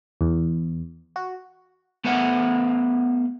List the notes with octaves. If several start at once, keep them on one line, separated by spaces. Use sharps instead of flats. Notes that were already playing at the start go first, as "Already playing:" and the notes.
E2
F#4
A3 B3 A4 C5 E5 F#5